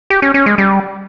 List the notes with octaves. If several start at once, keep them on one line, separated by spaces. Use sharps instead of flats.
G4
C#4
C#4
G#3
G3